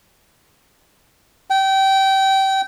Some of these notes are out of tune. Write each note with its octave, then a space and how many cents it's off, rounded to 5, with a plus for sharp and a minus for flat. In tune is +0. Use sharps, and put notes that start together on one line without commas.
G5 -25